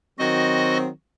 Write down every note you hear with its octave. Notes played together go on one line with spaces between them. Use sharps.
D#3 F#3 C4 F#4 D#5